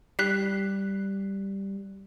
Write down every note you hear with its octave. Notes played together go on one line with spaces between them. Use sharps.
G3 F#6 B6 C7